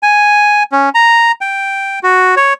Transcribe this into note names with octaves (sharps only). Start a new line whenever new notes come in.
G#5
C#4
A#5
G5
F#4
C#5